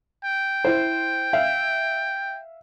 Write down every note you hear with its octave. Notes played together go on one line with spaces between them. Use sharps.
G5
E4 C5
E5 F5